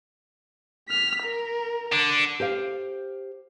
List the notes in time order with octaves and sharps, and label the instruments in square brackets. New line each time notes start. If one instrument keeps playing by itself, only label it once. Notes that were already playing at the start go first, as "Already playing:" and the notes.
[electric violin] F6 B6
A#4
[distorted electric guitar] D3 D4
[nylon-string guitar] G4 C5 F5